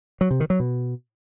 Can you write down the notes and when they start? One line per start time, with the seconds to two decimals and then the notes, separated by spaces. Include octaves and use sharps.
0.21 F#3
0.31 C3
0.40 D#3
0.50 F#3
0.60 B2